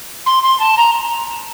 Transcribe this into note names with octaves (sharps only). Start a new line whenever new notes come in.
C6
C6
A5
A#5